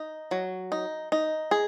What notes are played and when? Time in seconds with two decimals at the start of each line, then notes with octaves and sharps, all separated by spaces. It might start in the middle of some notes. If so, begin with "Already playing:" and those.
Already playing: D#4
0.31 F#3
0.72 D#4
1.12 D#4
1.51 G#4